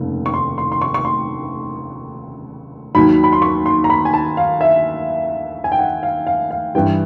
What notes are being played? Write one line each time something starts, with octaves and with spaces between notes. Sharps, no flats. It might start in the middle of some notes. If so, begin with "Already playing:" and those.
Already playing: F1 D#2 C#3
C#6
C6
C6
C6
C#6
C#6
C6
D#2 D#3 F#3 B5
B5
C6
C#6
C6
A#5
B5
G#5
A5
F5
E5
G#5
G5
F#5
F5
F5
F5
G2 E3 G3 G5